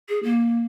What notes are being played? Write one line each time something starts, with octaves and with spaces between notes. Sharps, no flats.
G#4
A#3